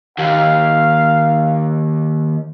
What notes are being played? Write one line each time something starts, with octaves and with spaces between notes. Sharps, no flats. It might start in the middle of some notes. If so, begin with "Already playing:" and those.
D#2 F5